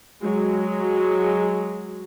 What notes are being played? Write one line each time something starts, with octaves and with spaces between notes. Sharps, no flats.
F#3 G#3